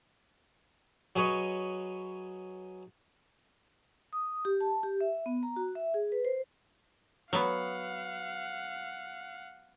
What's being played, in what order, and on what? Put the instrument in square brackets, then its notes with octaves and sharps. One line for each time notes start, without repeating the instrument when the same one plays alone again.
[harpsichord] F#3 G#4 B4 C#5 D#5
[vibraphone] D#6
G4
A5
G4
E5
B3
A#5
F#4
E5
G#4
B4
C5
[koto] F#3 B3 [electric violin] F5 F#5